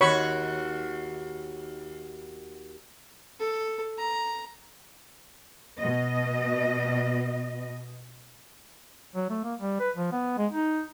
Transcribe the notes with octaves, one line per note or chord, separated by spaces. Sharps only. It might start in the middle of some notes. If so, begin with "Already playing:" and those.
D#2 F#4 C#5 B5 C#6
A4
A#5
B2 D#5
F#3
A3
A#3
G3
B4
F3
B3
G#3
D#4